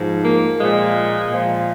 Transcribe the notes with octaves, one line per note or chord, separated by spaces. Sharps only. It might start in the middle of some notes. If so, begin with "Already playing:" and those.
Already playing: G#2 F3
A#3
A#2 F3 G#3
A#2 F3